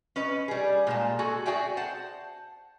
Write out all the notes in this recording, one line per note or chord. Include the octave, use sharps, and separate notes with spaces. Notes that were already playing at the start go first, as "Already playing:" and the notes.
C#4 B4 D#5
G3 G#4
A#2 G#3 A5
F#4 G#4 A4
F#4 G#4 D5 E5 G5 G#5
C5 F#5 A5